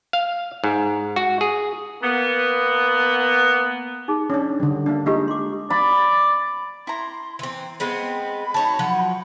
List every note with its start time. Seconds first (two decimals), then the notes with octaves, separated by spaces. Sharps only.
0.13 F5
0.64 G#2
1.16 F#4
1.41 G#4
2.02 A#3 B3
4.08 D#4 G#4
4.30 C#4 D4
4.60 D3 G3
4.86 A#3 D4
5.06 G#3 D#4 F4 G4
5.28 C6 D6
5.70 D5 B5
6.87 E4 A#5 C6
7.39 E3 C4
7.80 G#3 B3 C4 B5
8.54 D#4 F#4 C#5 A5
8.79 F3 F#3 F#5